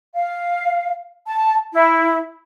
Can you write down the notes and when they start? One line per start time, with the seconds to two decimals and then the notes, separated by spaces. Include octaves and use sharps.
0.15 F5
1.26 A5
1.73 E4